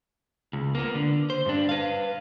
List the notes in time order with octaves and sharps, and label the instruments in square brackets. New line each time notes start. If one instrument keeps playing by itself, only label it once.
[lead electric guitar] C#2
A#3 B3
D3
C5
G2 D4
B4 F5